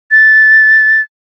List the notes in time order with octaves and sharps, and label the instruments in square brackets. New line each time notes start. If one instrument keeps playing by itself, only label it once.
[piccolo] A6